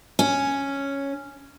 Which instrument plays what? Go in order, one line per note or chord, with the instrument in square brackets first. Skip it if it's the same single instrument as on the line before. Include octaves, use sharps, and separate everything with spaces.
[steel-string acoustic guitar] C#4